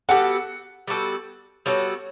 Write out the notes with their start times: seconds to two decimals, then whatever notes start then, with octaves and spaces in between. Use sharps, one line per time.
0.09 G3 B3 F#4 A4 F#5
0.87 G3 B3 F#4 A4
1.66 G3 B3 F#4 A4 C#5